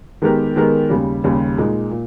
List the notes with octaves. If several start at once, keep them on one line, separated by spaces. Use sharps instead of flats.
D#3 G#3 B3 G4 A#4
D#3 G#3 B3 G4 A#4
D#2 C#3 G3
D#2 C#3 G3
A#2 G#3 D#4
A#2